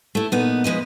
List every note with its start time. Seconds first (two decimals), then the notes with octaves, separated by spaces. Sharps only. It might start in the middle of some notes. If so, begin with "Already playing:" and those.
0.15 A3 E4
0.32 A#2 B3 D#4
0.64 F3 G#3 B4 D#5